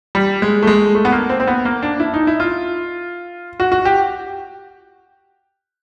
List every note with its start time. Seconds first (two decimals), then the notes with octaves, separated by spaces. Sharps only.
0.15 G3
0.42 G#3
0.63 A3
0.67 G#3
0.95 A3
1.05 B3
1.12 A#3
1.29 C4
1.40 C4
1.47 B3
1.65 A#3
1.83 D4
2.00 E4
2.14 D#4
2.27 E4
2.40 F4
3.60 F#4
3.72 F#4
3.85 G4